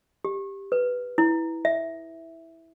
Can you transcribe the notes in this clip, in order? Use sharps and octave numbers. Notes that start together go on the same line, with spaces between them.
G4
B4
E4
E5